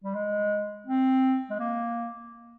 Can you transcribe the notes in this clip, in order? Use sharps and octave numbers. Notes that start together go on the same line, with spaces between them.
G3
G#3
C4
G#3
A#3